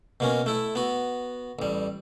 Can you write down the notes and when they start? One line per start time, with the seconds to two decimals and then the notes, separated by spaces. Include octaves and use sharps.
0.20 B2 A#3 C#4
0.46 A3 E4
0.75 B3 F#4
1.59 A1 G3